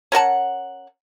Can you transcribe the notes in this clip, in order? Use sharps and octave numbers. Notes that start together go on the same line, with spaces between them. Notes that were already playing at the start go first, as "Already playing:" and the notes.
C#4 A#4 F#5 A5